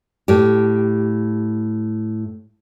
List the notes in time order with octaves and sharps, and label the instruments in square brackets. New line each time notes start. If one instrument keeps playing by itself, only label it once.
[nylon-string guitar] A2 G4